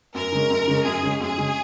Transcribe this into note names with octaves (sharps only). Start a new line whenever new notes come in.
F#2 A#4
C#3 G#3 C#4
F#2
C#3 G#3 C#4
F#2 G#4
C#3 G#3 C#4
F#2 G#4
C#3 G#3 C#4